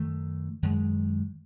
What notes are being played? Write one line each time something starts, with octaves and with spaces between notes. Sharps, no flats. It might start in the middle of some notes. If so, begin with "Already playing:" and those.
Already playing: F#2 D#3 A3
F#2 D#3 G#3